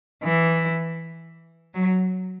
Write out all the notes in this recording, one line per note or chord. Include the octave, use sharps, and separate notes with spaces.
E3
F#3